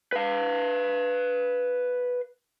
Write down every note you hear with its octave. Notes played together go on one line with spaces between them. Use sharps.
B4 F5